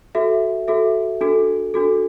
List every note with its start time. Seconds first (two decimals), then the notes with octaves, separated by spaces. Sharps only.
0.15 F#4 A4 E5
0.68 F#4 A4 E5
1.21 D4 F#4 A4
1.74 D4 F#4 A4